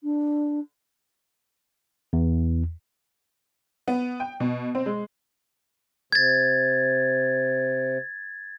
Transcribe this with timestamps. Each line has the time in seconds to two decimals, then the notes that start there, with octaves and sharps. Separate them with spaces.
0.03 D4
2.13 E2
3.88 B3
4.20 G5
4.40 B2
4.75 C4
4.86 G#3
6.12 C3 G#6 A6